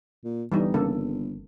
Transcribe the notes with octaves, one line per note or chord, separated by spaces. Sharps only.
A#2
G1 E3 G3 D#4
C#3 A#3 A4